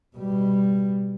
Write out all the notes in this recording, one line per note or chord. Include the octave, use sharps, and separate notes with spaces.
B2 G3